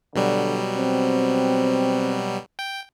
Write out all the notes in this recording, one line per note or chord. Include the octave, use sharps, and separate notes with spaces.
B2 D3 F#3 G3
C4
G5